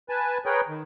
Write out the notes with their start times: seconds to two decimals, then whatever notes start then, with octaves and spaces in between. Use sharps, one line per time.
0.09 B4 G#5 A5
0.46 G#4 A#4 B4 C#5 G5
0.68 D#3